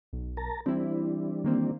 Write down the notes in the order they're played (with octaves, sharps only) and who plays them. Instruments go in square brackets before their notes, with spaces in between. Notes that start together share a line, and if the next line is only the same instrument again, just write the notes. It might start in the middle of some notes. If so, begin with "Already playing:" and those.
[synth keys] B1
[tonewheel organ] A#4 A5 A#5
[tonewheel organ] E3 G3 D4 [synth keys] C4 E4
[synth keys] D#3 A#3 C4